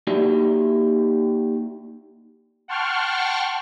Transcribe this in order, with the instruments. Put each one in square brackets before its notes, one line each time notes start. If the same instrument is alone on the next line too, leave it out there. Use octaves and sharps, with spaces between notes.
[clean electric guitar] A#3 D#4 F#4 G4 D5 E5
[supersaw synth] F#5 G5 A5 C6 C#6 F6